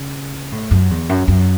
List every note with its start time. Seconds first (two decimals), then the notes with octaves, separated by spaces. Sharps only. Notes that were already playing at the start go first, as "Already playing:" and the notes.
Already playing: C#3
0.52 A2
0.71 F#2
0.91 E2
1.09 F#2
1.28 F#2